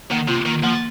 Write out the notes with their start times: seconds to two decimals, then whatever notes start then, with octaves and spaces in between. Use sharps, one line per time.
0.11 D#3 A#3
0.28 C3 F4
0.46 D#3 A#3
0.63 F3 A#3